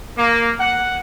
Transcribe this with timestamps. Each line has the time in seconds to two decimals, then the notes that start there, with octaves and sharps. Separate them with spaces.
0.16 A#3
0.58 F#5